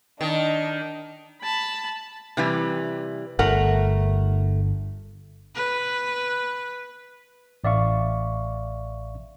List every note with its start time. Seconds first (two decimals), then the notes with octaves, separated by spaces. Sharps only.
0.21 D#3 D4 D#5
1.42 A5 B5
2.37 C3 E3 G3
3.39 G1 A3 A#4 F#5
5.55 B4
7.64 A1 D5 E5 F5 C#6